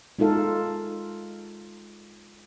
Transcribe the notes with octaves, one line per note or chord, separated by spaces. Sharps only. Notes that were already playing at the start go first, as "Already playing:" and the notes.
G#3 D#4 F4 A4 F5